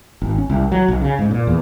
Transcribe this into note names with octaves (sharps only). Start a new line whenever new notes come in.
G#1
C#4
C2
F#3
B1
C#3
G#2
A#2
E2